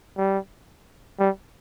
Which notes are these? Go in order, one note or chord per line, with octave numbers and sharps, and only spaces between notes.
G3
G3